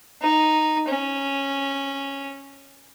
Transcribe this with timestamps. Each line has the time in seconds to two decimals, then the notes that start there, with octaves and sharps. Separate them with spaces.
0.22 D#4
0.88 C#4